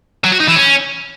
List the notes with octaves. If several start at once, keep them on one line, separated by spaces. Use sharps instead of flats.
F#3
F#4
D#4
E3
C#4